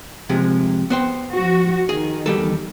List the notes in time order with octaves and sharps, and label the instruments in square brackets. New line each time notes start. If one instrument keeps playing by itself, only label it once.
[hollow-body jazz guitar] C3 F3 G#3
B3 C5 G5
[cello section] F3 F#4
[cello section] D#3 [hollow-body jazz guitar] G#4
[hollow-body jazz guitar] E2 G3 A4